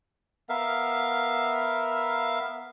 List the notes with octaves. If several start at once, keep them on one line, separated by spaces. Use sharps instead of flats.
B3 A#4 E5 F5